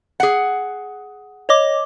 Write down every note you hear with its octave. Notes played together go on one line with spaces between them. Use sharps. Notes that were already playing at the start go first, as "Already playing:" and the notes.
G#4 F#5
C#5 D#5 D6